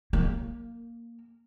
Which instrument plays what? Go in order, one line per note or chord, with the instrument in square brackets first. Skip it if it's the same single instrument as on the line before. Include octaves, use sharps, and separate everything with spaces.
[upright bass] A#3